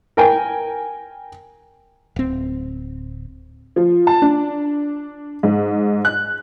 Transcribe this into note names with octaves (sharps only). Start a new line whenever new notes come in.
A#4 G5 G#5
D1 C4
F3
A5
D4
G#2
F#6